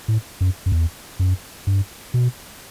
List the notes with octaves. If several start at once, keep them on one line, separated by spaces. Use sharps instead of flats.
A2
F#2
F#2
E2
F#2
G2
B2